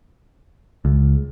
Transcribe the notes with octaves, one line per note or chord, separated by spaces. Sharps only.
C#2